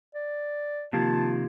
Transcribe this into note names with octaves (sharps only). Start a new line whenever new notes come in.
D5
C3 D#3 F3 A#3 F4 G4 A5 G#6